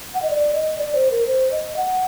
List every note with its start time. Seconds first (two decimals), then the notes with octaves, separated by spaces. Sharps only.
0.14 F#5
0.23 D#5
0.30 D5
0.54 D#5
0.78 D5
0.95 C5
1.11 A#4
1.27 C5
1.52 D#5
1.76 F#5